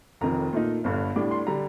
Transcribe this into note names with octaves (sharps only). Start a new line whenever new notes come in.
F1 F2 D#3 A#5
A#2 A3 D#4
G1 G2 D3
A2 G3 D4 D6
C6
D3 G3 A#5